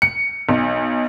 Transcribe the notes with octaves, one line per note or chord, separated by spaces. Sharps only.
C#7
B1